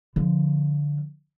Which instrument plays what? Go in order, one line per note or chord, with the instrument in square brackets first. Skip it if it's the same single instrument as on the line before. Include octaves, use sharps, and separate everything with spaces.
[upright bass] D3 F3